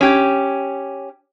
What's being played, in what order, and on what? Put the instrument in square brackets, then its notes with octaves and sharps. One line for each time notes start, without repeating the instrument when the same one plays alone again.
[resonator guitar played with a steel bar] C#4 G4